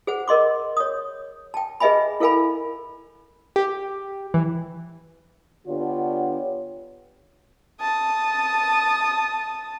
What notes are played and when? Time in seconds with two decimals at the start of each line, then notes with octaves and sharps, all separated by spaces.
0.07 G#4 C5 F#5
0.28 A#4 D#5 C6 D6
0.77 C#5 D#6
1.54 G5 A5
1.80 G#4 B4 D#5 E5 G#5 B5
2.20 E4 A4 A#4 F5 G#5 B5
3.56 G4
4.34 E3
5.67 D3 B3 D4 F4 G4 C#5
7.81 A5 D#6